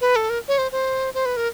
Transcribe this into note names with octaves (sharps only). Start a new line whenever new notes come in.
B4
A4
A#4
C#5
C5
C5
C5
B4
A#4